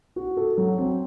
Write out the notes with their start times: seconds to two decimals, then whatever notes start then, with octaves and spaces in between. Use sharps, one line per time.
0.16 F#4
0.37 A4
0.58 F#3
0.78 C4